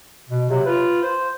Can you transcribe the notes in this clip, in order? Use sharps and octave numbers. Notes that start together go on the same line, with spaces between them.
B2
C3 F#3
F4 B4
C5